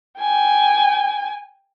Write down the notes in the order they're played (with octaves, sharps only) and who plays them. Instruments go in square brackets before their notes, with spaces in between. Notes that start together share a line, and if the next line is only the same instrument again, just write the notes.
[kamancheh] G5 G#5